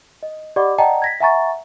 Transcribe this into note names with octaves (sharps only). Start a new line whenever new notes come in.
D#5
G4 D5 D#5 F#5 B5 D6
D5 D#5 F#5 G5 A5 A#5
G#6 A#6 B6
E5 F#5 G#5 A#5 C#6 A6